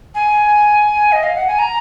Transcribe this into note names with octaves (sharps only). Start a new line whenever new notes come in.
G#5
D#5
F5
F#5
G#5
A#5